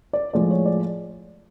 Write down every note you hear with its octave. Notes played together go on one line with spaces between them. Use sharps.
D5
A2 F3 G#3 D5
C#5
D5